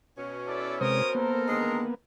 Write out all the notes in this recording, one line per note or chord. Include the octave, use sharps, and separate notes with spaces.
B2 C#4
E4 A4 D5
C3 G#3 A#4 C5 D#6
A#3 B3 A4 A#4
D3 D#3 G#3